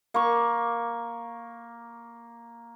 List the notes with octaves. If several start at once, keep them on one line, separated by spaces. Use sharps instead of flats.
A#3 C#6